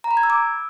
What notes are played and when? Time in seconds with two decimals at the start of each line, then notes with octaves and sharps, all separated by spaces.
0.04 A#5
0.11 B5
0.17 G#6
0.23 E6
0.30 D6